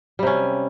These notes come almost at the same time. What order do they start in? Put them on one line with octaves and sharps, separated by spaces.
G3 C3 C#4